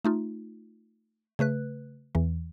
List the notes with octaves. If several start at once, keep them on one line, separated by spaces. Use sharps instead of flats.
A3 D#4 F4
C#3 A3 B4 F#6
E2 E3